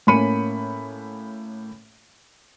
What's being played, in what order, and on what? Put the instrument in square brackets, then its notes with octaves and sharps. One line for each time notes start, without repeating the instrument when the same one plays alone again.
[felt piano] A2 A#3 C#4 B5 C#7 D#7